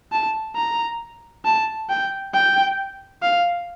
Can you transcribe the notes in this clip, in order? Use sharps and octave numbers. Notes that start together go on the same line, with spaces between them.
A5
A#5
A5
G5
G5
F5